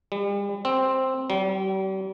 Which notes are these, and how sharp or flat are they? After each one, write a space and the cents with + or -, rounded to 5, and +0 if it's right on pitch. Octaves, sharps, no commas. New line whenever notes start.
G3 +40
C4 +5
G3 -40